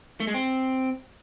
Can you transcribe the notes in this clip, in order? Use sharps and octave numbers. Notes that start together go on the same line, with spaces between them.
A3
G#3
C4